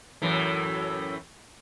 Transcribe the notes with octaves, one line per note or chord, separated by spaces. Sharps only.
F#2 A2 E3